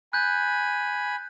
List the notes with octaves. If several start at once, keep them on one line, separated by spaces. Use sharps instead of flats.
G#5 B5 F#6 G6